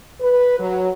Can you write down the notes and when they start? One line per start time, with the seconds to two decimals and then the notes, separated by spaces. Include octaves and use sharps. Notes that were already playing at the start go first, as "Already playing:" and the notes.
0.21 B4
0.59 F#3